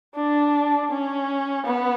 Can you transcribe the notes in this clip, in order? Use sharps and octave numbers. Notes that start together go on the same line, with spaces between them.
D4
C#4
B3